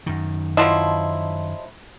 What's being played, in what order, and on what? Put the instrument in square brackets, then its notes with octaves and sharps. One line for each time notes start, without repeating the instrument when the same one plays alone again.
[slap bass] F#2 D#3
[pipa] F3 F#3 E4 [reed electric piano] D#5 A5 C6